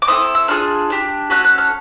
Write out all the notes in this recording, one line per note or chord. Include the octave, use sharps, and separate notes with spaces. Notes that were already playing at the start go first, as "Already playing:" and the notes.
D6
C4 E4 A4 D#6
E6
D4 F4 G#4 F6
D4 G4
A3 C#4 F#4 A4 F#6
F#6
F6